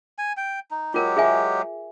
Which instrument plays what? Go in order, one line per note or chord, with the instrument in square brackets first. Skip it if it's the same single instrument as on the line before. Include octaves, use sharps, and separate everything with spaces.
[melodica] G#5
G5
D#4
[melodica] F#3 G#3 G4 [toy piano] F4 A#4
[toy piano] G#4 E5 G#5